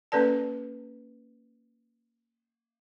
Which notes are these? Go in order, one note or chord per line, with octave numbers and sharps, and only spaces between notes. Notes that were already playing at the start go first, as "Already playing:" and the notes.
A#3 C#4 A4 B4 D5 A5